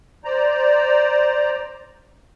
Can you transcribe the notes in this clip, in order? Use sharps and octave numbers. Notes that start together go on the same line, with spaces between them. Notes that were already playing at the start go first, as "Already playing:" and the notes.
C5 D5 A#5